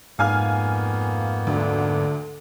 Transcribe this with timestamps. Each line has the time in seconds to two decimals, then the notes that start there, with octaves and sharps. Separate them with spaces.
0.19 F2 G#2 A#3 B3 F5 G#5 F6
1.47 D2 D3